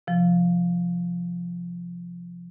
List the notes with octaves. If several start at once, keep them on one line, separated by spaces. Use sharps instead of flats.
C3 F3